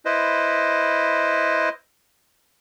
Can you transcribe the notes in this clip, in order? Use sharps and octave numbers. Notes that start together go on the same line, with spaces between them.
E4 B4 C5 D#5